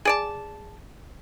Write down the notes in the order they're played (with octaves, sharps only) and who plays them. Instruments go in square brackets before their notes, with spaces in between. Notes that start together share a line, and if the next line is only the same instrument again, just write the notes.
[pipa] G#4 D5 A5